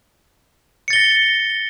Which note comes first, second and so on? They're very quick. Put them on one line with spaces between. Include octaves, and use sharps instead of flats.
C#7 A6 G7 A#6